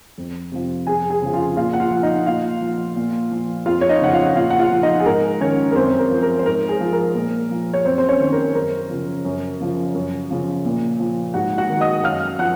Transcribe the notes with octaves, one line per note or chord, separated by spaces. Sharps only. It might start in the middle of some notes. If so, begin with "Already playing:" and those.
F2
C3 F3
F2 G#4 G#5
G#4 G#5
C#3 F3
F4 F5
A#2 F4 F5
F#5
F4 F5
F3
D#4 D#5
A#2 F4 F5
F3
A#2
F3
F2 F4 F5
C#5
D#4 D#5
C#3 F3 F#5
F4 F5
A#2 F4 F5
F#5
F4 F5
F3
D#4 D#5
G#4
G#2 A#4
D#3 C#4 C#5
A#4
F#2 C4 C5
A#4
F3
A#4
C5
G#2 A#4
G#4
F3
A#4
A#2
F3
C#5
F#2 C4 C5
C5
C#4 C#5
D#3
A#4
F#2 A#4
C#3 F3
F#2
C#3 F3
F#2
C#3 F3
A#2
F3
G#2 F#4 F#5
F#4 F#5
D#3
D#5 D#6
F#2 F5 F6
F3 F#5 F#6